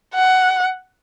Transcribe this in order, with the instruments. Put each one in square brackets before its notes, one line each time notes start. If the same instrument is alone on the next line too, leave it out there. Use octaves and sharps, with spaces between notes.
[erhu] F#5